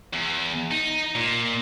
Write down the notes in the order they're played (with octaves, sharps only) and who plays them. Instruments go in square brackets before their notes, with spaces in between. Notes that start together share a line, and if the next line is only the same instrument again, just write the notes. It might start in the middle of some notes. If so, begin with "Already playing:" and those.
[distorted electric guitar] E2
D#4
A#2